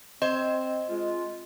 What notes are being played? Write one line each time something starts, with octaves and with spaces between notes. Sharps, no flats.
C4 C5 D#5
G#3 F4